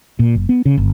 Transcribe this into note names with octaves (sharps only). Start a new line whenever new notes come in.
A#2
F#1
B3
C#3
G1